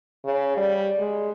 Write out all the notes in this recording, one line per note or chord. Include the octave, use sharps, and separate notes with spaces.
C#3
G3
G#3